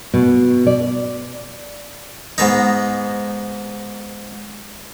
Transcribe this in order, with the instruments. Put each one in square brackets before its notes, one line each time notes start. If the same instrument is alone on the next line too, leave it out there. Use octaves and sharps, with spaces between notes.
[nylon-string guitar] B2
D5
[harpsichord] G#2 B3 D#4